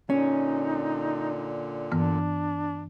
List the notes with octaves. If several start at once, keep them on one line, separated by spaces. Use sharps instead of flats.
A#2 D3 C#4 D#4
G2 E3 B3 D4